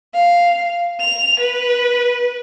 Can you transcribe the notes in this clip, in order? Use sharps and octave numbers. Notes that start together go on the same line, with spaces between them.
F5
F7
B4